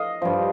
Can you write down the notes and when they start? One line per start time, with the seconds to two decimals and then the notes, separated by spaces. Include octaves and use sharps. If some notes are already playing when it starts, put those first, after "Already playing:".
Already playing: D#5 F5
0.22 G2 F3